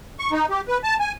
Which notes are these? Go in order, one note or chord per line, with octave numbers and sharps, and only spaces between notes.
C#6
D#4
G4
B4
A5
G#5